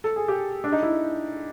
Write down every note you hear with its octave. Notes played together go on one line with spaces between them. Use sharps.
A4
G#4
G4
D4
D#4
E4